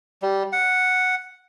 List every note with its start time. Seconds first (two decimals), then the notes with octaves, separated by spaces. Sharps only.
0.22 G3
0.53 F#5